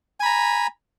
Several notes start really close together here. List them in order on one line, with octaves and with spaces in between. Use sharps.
G#5 B5 A#5